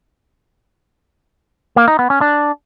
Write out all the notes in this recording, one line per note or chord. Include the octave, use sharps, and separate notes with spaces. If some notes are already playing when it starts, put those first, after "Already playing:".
A#3
D#4
B3
C#4
D4